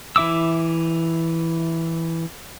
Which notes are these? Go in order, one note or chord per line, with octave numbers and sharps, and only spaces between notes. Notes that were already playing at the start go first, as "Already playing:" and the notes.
E3 E4 E5 D6 E6